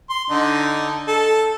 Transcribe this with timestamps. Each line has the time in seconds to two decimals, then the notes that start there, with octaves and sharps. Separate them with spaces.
0.10 C6
0.30 D3 D#4
1.08 A4